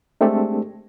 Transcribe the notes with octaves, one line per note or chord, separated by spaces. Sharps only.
G#3 A3 C4 D4 G4 A4